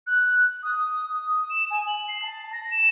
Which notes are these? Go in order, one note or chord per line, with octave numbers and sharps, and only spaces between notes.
F#6
D#6
D#6
E7
G#5
F#7
C7
A5
A#6
E7